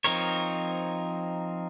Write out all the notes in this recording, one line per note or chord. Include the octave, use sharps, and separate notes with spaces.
F3 C4 D#4 A#4 C#5